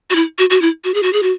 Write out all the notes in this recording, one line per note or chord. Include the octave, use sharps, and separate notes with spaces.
F#4
E4
F#4
F#4
E4
F#4
G#4
F#4
G#4
F#4